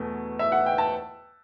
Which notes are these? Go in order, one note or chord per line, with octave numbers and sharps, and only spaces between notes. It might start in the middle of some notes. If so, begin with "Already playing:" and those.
Already playing: E2 B2 A3
E5
F#5
G5
A5